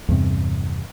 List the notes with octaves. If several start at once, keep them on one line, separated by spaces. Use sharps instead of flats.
E2 G2 C3